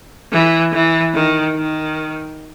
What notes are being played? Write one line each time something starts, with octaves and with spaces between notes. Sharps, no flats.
E3
E3
D#3
D#3